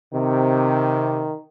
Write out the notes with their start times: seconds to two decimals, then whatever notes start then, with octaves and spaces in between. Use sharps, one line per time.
0.13 C3 D#3